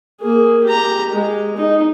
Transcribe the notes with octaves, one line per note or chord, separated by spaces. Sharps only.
A#3 G#4
G4 A#5
G#3
D#4